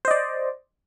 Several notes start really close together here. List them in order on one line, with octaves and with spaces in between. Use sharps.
C5 D#5 D5